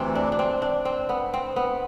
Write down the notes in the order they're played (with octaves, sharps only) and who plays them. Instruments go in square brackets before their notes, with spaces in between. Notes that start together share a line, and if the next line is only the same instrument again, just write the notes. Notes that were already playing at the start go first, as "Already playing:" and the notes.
Already playing: [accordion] D2 C3 E3 [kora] C4
[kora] D4
D4
C4
D4
C4
B3
C4
B3